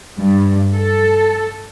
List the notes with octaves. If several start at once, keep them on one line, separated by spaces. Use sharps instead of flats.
G2
A4